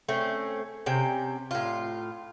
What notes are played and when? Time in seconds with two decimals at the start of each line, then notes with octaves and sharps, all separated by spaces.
0.09 A3 C4 C#4
0.86 C3 C#4 G5
1.51 A2 F4